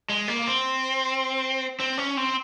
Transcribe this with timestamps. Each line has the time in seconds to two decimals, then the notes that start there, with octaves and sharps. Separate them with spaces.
0.10 G#3
0.28 A#3
0.48 C4
1.80 C4
1.98 C#4
2.17 C4